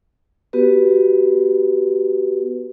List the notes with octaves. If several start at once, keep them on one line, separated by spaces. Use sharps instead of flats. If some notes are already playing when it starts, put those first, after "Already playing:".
B3 F#4 G4 B4